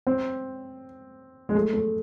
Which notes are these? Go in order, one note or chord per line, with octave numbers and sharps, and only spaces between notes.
C4
G#3
A3
A3